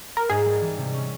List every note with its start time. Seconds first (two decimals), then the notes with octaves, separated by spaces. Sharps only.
0.17 A#4
0.30 G#2 G#4
0.45 G3
0.61 E3
0.78 C3
0.93 C#4